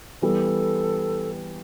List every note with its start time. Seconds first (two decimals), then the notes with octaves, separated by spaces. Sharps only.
0.22 E3 G3 B3 A4